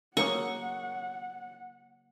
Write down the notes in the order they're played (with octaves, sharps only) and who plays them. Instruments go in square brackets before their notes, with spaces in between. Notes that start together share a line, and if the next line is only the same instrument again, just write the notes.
[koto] C#3 F#3 A#3 [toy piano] A#4 C#5 D#6 [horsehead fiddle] F#5 [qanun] C#6